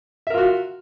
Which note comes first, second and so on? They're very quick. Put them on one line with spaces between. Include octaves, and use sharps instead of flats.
E5 A#4 F4 F#4